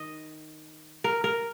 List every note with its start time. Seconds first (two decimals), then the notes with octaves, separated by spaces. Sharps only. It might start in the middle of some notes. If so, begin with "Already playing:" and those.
Already playing: D#3 D#5
1.04 A#4
1.24 A#4